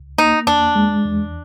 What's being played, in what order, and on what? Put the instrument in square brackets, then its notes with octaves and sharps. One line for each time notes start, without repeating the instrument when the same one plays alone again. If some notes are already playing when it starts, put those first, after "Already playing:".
Already playing: [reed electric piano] C#2
[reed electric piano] A#3 [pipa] D#4
[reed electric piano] E2 [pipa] D4
[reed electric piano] G#3
E2